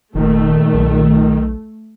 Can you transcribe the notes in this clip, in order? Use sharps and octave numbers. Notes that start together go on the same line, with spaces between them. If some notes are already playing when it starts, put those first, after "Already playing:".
F#1 A#2 D#3 A3
B1